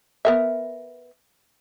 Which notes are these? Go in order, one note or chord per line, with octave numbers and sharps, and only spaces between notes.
B3 A#4 E5